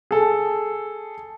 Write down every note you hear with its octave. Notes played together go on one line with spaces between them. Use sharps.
G#4 A4